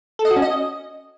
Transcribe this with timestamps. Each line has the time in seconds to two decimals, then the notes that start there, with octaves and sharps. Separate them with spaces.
0.19 A4
0.25 D#5
0.31 F#4
0.36 C#4
0.42 D#5